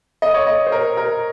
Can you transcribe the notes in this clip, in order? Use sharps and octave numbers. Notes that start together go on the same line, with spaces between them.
D#5
C#5
D#5
C5
A#4
A#4